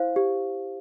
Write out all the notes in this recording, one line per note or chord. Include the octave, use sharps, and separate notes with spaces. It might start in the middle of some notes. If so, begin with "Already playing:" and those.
Already playing: E4 C5 F5
G4